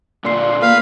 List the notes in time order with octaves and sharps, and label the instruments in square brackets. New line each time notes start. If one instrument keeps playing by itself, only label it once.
[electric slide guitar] A#2 D3 [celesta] D5 C6 C7
[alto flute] A#3 [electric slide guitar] B4 [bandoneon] F5